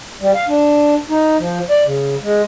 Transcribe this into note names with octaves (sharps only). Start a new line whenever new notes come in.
G3
F5
D4
D#4
F3
D5
C#3
G#3